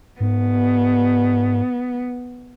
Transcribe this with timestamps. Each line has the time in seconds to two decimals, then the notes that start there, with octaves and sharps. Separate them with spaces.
0.20 G#2 B3